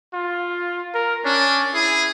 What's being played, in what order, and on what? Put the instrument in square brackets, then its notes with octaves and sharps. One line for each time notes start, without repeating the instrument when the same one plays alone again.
[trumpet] F4
A#4
[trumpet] C#4 [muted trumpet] D4
[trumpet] E4 [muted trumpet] G#4